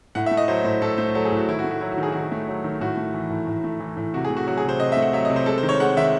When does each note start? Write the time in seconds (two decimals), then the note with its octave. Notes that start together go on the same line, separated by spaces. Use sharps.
0.15 A2 F#5
0.26 E5
0.31 A3
0.37 D#5
0.48 F#3 C5
0.64 A2 C5
0.82 A2 A4
0.98 A3 C5
1.15 F#3 A4
1.25 G#4
1.32 A2 F#4
1.49 D#3 E4
1.59 F#4
1.64 A3
1.71 F#4
1.81 F#3 E4
1.92 F#4
1.97 D#3
2.03 G#4
2.12 D#3 F#4
2.20 G#4
2.32 A3
2.48 F#3
2.64 D#3
2.81 A2 F#4
2.97 A3
3.14 E3
3.30 A2
3.47 A2
3.64 A3
3.80 E3
3.97 A2
4.14 C3 F#4
4.25 G#4
4.30 A3
4.37 F#4
4.47 F#3 F#4
4.58 G#4
4.64 C3 C5
4.80 C3 D#5
4.92 E5
4.97 A3
5.02 F#5
5.13 F#3 E5
5.25 D#5
5.30 C3
5.36 C5
5.46 G#3 A4
5.58 C5
5.63 D#3
5.69 C#5
5.80 G#3 F#5
5.97 D#3 E5